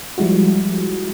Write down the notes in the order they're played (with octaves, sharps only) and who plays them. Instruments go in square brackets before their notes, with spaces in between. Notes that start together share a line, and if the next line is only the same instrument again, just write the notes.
[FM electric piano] F3 G3 G#3 E4 F#4